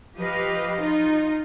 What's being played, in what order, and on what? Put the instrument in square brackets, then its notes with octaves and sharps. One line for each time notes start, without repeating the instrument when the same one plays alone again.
[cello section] F3 G4 B4 D#5 F5
D#4 F4